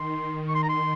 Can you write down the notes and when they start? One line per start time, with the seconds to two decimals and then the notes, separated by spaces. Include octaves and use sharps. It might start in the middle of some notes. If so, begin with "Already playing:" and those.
Already playing: D#3 C6
0.12 D#3
0.48 C#6
0.55 C6
0.63 A#5
0.69 C6